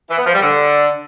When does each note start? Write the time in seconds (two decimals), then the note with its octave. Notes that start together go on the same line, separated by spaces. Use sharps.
0.10 E3
0.18 B3
0.26 F3
0.34 G3
0.42 D3